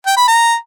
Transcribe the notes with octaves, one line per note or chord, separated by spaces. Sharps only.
G5
B5
A#5